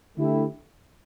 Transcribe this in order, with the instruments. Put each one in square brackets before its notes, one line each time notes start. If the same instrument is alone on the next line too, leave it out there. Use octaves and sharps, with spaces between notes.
[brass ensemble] D3 A3 E4 G4